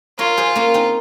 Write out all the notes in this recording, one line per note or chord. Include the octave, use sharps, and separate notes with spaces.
F4 A#4 C#5
G#4 C5
A#3 C#4
C4 D#4